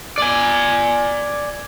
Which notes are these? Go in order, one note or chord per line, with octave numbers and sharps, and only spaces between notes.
D5 G#5